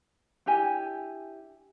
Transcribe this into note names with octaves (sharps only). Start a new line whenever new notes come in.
D4 E4 G4 G#5